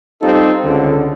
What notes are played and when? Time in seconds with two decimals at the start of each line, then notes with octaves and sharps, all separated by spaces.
0.22 G3 C4 D#4 F4 G4 A4
0.65 C#2 D3